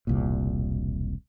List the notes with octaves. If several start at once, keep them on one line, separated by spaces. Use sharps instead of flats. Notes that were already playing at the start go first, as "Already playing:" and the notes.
E1 C2 A#2